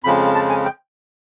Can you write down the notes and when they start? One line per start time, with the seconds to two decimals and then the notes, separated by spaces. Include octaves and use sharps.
0.04 F2 C#3 F3 G#3 B5
0.35 A5
0.50 G#5
0.65 G5